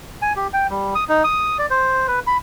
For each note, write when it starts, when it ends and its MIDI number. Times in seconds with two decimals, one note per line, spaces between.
0.22 0.33 80
0.36 0.47 67
0.53 0.67 79
0.70 0.94 55
0.95 1.04 87
1.09 1.23 63
1.24 1.57 87
1.59 1.66 74
1.70 2.07 72
2.08 2.20 71
2.27 2.37 83